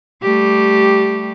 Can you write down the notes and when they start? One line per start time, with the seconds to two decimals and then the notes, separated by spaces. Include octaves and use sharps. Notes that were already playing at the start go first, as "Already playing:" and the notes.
0.22 G3 A3 G4